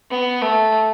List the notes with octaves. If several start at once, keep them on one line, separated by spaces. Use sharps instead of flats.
B3
A3